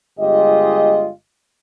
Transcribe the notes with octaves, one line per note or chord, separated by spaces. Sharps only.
G1 G#3 F4 G4 G#4 D#5